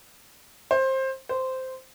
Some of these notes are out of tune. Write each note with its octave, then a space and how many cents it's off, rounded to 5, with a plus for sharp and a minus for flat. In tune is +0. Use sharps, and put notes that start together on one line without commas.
C5 +20
C5 -10